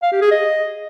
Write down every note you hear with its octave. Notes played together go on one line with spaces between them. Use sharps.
F5
G4
G#4
D#5